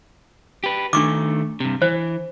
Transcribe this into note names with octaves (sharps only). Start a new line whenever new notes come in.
G4 B4
D#3 A3 D4 C#6 D6
G2 C3
E3 C5